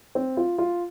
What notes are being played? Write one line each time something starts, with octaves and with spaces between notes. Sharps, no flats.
C4
F4
F4